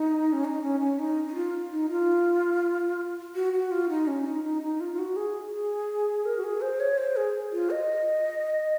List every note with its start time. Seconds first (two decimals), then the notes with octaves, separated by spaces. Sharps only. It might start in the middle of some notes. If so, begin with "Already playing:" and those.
Already playing: D#4
0.33 C#4
0.45 D#4
0.63 C#4
0.80 C#4
0.99 D#4
1.28 D#4
1.35 F4
1.71 D#4
1.90 F4
3.35 F#4
3.53 F#4
3.71 F4
3.89 D#4
4.07 C#4
4.26 D#4
4.44 D#4
4.62 D#4
4.80 F4
4.94 F4
4.99 F#4
5.16 G#4
5.53 G#4
6.25 A#4
6.37 F#4
6.44 G#4
6.61 C5
6.80 C#5
6.98 C5
7.16 G#4
7.52 F4
7.70 D#5